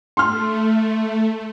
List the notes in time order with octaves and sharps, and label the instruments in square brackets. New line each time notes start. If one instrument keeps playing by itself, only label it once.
[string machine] A3 [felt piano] C6 F6